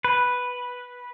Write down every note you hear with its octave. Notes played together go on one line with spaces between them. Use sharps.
B4